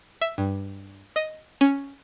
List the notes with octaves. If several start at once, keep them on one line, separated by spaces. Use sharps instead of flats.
E5
G2
D#5
C#4